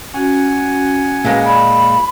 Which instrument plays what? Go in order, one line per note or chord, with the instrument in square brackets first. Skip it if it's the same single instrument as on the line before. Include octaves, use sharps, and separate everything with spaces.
[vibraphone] C#4 F#4 [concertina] F#5 G#5
[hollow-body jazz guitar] A#2 G#3 [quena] B4
[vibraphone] D5 [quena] B5